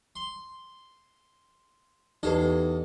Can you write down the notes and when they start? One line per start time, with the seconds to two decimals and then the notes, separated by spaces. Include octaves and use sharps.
0.16 C6
2.23 E2 D#4 G4 A4 B4 D#5